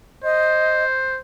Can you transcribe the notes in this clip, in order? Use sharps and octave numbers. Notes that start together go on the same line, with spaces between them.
C5 D#5